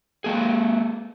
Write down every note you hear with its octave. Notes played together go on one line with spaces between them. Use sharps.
G#3 A#3 G#4